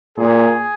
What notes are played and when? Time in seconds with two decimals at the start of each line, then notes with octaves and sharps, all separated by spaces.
0.18 A#2 G#4